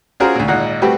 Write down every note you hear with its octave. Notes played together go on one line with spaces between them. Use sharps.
C#4 F4 F#4 G#4 A#4 C5
D2 A#2
G#1 A#2 D#4 F#5
G3 A3 C4 F#4 G4 B4